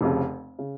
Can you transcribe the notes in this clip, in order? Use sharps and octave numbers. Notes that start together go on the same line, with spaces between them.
F1 F2 C#3
C#3